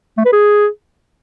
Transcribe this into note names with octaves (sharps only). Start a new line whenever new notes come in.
A3
B4
G#4